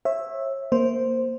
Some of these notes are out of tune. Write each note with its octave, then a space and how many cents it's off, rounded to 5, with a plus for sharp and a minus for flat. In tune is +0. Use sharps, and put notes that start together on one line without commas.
C#5 -35 E5 +0
A#3 +0 C5 +0